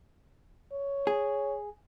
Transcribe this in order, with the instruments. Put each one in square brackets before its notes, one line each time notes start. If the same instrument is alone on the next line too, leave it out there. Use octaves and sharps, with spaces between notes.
[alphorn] C#5
[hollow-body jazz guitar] G#4